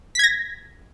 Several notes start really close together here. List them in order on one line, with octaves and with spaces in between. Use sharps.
B6 G#6 A#6